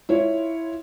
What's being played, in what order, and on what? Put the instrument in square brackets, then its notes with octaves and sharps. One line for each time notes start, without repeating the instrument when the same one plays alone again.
[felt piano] E4 F4 C#5